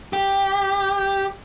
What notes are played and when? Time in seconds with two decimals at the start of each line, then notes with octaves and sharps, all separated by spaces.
0.13 G4